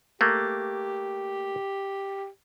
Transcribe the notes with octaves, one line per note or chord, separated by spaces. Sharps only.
A3 A#3 G4